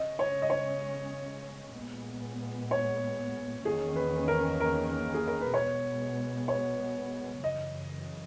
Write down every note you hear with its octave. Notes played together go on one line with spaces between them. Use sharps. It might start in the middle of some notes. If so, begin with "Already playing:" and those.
Already playing: C#3 G#3 C#4 D#5
C#5
D#5
C#5
A#2 G#3 B3
C#5
E2 D#3 A#3 C#4 G#4
B4
A#4
A#4
G#4
A#4
B4
B2 G#3 B3 C#5
C#5
F#2 C#3 E3 D#5